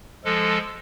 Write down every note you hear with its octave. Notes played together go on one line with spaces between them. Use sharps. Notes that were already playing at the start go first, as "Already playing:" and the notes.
F3 G#3 A4